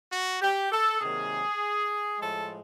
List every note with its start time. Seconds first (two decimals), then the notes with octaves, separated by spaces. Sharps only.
0.12 F#4
0.42 G4
0.72 A4
1.01 C3 D#3 F#3 A#3 G#4
2.19 A2 F3 G#3 A4